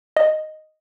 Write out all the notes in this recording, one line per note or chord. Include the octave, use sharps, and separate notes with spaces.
D#5